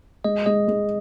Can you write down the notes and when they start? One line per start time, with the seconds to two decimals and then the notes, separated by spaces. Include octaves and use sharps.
0.24 G#3 D#5
0.46 G#3 D#5
0.68 G#3